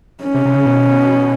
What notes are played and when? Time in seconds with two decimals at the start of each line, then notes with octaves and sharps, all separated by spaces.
0.23 C#4
0.35 C3
0.45 C3
0.55 C#3
0.66 B2